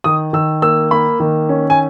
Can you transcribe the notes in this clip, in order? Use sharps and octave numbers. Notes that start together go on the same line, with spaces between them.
D#3 D#6
D#3 E6
A#3 E6
A#3 B5
D#3
C#4
G#5